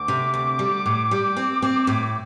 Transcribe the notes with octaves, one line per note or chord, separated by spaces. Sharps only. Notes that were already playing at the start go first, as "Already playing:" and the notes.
Already playing: D2 D6
C3
D2
G3
A2
G3
C4
C4
A2
D6